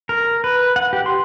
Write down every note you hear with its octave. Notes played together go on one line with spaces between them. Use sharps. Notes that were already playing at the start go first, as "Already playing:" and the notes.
A#4
B4
F#5
G4
C6